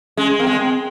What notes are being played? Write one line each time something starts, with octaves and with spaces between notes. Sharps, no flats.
G#3 C#4
A#3 C4
G#3
C4